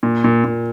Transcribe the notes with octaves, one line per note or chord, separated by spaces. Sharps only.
A#2
A#2
A#2